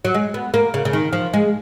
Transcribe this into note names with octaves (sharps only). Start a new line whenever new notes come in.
F#3
G#3
B3
A#3
C#3
C#3
D#3
F3
G#3